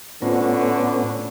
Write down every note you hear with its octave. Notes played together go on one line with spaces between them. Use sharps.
A2 D3 B3 C#4 F4 C5 F#5